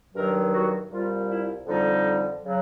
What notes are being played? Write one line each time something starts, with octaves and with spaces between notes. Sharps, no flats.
G2 D#3 F#3 A#4
F#4
C2 A#2 G3 F4
E4
F2 D3 G3 D#4
C#3 F#3